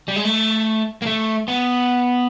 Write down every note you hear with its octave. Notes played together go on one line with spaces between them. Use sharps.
G3
G#3
A3
A#3
A3
B3